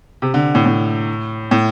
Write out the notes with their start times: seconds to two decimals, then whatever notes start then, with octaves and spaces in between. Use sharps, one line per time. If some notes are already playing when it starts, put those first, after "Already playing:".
0.22 C3
0.34 D3
0.55 A2
0.66 A2
1.51 A2